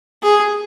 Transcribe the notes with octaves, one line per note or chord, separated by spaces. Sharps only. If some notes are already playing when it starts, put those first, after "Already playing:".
G#4